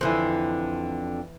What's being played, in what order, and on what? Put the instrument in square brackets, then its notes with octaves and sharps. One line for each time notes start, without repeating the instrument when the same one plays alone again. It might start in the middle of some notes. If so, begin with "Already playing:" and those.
[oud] F2 D3 [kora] E3 E4 C5